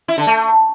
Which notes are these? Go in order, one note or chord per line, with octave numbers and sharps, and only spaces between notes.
E4
D3
A3